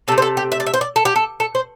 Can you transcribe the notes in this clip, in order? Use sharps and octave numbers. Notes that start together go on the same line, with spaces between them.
C3 A3 A4
C5
A4
G4
E5
D5
E5
C5
D5
A4
G4
A4
A4
C5